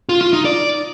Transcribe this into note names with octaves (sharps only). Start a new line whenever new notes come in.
F4
F4
D#4
D5